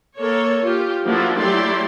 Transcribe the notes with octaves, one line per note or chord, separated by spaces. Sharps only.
A#3 A4 C#5
F4 G4
F3 A3 A#3 D4 E4 F#4
F#3 A3 E4 G4 D5 C6